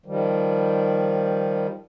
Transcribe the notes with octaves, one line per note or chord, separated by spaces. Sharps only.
D#3 F3 G3